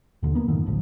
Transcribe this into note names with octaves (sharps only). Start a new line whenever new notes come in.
D#2 D3
F3 A#3 B3
F#2 A2 D3 D#3
G#1 D2 A2 F3